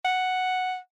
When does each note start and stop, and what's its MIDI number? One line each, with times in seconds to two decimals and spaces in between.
0.05 0.77 78